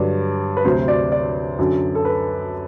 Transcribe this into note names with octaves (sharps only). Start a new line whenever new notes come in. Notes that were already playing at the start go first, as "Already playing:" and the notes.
Already playing: G2 D3 F#3 D5
B4
D2 C3 F#3 C5
D5
D5
F#2 D3 F#3
A4
B4